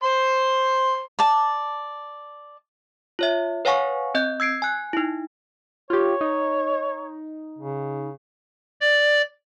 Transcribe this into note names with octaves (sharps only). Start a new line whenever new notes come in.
C5 C6
D5 A5
F4 C#5 E5
B4 C#5 F5 F#5 G#5 C#6
C4 D#5 G6
E6 G#6 C7 D7
G#5 F#6
D#4 E4
F4 G4 C#5
D#4
C#3
D5